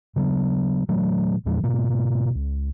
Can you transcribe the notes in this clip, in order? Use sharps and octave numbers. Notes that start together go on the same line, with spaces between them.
C#3 F#3 B3
A#2 E3 F#3 A3
E2 A#2 F3 G#3
G#2 B2 A#3
C#2